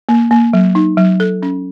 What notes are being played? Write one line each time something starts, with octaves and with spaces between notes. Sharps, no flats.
A#3
A#3
F#3
D#4
F#3
A4
C#4